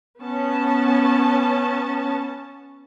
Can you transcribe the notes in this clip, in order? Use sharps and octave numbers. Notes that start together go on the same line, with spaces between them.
B3 C#4 A5